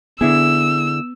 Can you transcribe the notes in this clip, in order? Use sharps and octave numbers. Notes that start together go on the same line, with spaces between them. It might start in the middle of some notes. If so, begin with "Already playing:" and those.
D3 B3 E4 G#4 E6